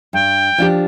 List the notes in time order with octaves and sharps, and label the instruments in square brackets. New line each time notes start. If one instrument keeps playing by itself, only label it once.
[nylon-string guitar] G2 [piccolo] G5
[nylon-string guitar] F3 D4 G4